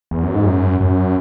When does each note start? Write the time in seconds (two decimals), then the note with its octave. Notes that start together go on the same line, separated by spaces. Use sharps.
0.11 E2
0.23 F#2
0.34 G#2
0.46 F#2
0.80 F#2